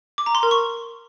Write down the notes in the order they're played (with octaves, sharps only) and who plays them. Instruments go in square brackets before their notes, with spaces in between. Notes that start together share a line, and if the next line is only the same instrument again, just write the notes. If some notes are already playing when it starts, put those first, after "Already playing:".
[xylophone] D6
A#5
C6
A#4
C#6